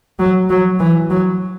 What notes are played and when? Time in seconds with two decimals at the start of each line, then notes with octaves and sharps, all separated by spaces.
0.19 F#3
0.50 F#3
0.80 E3
1.10 F#3